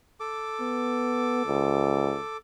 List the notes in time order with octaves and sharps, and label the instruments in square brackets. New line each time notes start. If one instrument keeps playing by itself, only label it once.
[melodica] A4 D6
[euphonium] B3
C#2